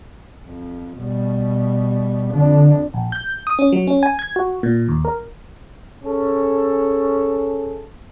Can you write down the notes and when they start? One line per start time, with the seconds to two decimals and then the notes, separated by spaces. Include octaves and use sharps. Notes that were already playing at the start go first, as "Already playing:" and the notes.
0.45 F2
0.98 B2 G3
2.34 F2 D3 D4
2.94 A#1
3.12 G6
3.47 D#6
3.59 C#4
3.72 F#3
3.87 C#4
4.03 G#5
4.19 G#6
4.36 F#4
4.63 A#2
4.88 D#2
5.05 A#4
6.04 C#4 G#4 A4